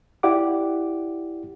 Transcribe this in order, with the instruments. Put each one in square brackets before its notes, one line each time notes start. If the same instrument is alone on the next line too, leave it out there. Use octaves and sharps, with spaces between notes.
[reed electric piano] E4 G4 D5 F#5 D6